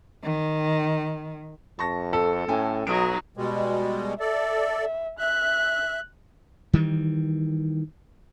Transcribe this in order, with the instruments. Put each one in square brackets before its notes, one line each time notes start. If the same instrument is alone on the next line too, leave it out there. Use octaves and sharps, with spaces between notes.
[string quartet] D#3
[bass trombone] F2 [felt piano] A5 C#6 A#6
[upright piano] A4
[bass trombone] A2 [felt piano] C#4 G5 G#5
[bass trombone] B1 [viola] F#3 D#4 [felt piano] D#6 D7
[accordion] B2 G3 G#3
[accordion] A4 D5 [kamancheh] E5
[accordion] E5 [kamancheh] F#6
[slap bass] D#3 E3 G3